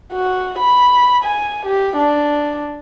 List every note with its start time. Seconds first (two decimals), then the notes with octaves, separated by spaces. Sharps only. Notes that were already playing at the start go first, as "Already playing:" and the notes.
0.13 F#4
0.58 B5
1.24 G#5
1.66 G4
1.97 D4